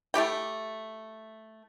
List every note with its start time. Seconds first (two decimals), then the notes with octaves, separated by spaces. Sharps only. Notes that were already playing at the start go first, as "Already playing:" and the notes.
0.14 A3 E4 G4 G5